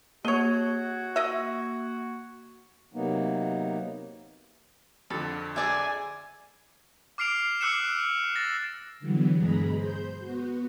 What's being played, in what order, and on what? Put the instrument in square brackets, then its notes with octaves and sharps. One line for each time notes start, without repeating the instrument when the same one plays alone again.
[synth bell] A#3 G#6 [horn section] F#4 [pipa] C#5 D#5
[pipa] D#5 E5
[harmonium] C3 F#3 A#3 B3 D#4
[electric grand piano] F2 D3 [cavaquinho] A4
[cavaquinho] G#4 D5 E5 [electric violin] G#5
[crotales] D6 F6 C7 D7 F7
D6 E6 F#6 C7 C#7 E7
A6 A#6
[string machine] D3 E3 F#3 G3 B3
G2 B2 G#3 G#4 A#5 B5
C5 G6
B3 F#4